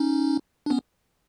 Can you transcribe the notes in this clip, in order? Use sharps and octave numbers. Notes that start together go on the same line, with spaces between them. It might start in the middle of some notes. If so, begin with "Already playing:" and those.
Already playing: C#4 D#4
D4
B3 C#4